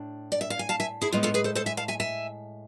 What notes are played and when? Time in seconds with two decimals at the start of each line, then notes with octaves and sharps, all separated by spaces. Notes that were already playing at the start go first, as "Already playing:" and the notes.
Already playing: A2 D4
0.32 D5
0.41 E5
0.50 F5
0.59 G#5
0.69 F5 A5
0.80 E5 G#5
1.01 E4 G#4
1.13 A2 G#3 B3 F4
1.23 F4 A4
1.34 G#4 B4
1.44 A4 C5
1.55 A4 C5
1.66 E5 G#5
1.77 F5 A5
1.88 E5 G#5
2.00 E5 G#5